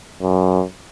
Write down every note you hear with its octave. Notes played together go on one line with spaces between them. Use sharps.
F#2